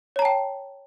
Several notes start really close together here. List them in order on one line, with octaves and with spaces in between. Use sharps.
C#5 A#5 A5 G5